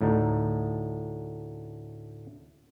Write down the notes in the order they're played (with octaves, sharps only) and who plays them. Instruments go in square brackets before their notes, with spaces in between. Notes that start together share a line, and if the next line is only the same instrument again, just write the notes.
[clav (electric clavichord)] D2 A2 D3 D#4